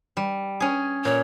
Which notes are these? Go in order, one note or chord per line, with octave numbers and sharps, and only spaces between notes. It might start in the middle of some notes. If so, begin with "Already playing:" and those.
G3
C#4 G#4
A#2 C#5